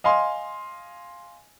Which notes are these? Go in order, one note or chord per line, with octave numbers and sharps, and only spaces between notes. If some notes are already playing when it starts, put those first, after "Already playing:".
D#5 F5 G#5 C6